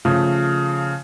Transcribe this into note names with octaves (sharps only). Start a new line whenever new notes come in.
C#3 F3 A3